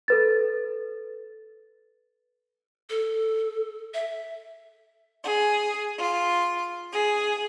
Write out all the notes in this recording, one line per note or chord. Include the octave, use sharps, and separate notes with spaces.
A4 B4 A6
A4
E5
G#4
F4
G#4